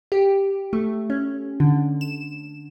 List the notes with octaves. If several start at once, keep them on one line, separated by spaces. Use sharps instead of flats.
G4
A3
C#4
D3
E7